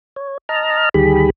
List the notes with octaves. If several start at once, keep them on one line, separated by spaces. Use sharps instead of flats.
C#5
D#5 A5 A#5 F6
D2 D#3 G3 G4 G#4 B5